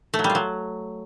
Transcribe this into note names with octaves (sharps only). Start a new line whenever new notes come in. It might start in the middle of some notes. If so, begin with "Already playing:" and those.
A3
F#3
G3
F4
F#3